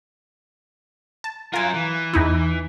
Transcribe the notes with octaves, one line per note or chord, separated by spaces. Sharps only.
A5
F#3 F4 A#4 G#5
E3
E2 D#4 E4